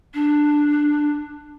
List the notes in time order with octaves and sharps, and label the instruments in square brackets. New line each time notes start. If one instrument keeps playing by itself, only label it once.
[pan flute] D4